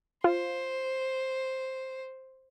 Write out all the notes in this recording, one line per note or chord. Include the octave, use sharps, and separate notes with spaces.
F4 C5